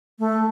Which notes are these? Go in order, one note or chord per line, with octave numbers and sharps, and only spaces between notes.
A3